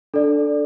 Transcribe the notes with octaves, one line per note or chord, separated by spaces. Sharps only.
D4 A4 D5